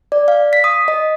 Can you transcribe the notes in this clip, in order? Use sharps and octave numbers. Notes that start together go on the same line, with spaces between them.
D5
F5
B6
D#6
D#5